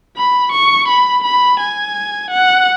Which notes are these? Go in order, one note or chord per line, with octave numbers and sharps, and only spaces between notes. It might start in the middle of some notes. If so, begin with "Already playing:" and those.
B5
C#6
B5
B5
G#5
F#5